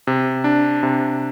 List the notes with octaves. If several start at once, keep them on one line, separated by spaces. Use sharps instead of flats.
C3
D4
C3